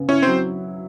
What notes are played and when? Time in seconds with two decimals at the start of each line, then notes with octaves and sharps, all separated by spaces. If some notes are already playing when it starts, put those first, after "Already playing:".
Already playing: C#3 B3
0.08 C#4 E4 C#5
0.22 F#3 C4 C5